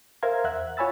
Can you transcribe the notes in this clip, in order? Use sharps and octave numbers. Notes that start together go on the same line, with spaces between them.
A#4 C5 E5 F5 A#5 G#6
E2 E5 F#5 F#6
F4 C#5 G#5 B5 E6 A6